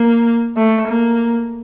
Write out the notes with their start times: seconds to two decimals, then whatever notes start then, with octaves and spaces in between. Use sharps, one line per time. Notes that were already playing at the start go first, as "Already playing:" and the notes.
Already playing: A#3
0.57 A3
0.88 A#3